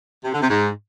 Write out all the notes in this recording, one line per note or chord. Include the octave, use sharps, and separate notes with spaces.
C3
D3
C3
G#2